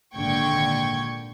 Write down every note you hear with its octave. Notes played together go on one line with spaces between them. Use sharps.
G#1 A#2 D3 G5 C#6 G#6